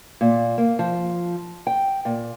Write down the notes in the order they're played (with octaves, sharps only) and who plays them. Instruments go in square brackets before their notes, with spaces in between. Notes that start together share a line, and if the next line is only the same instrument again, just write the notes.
[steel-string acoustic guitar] A#2
A#3
F3
G5
A#2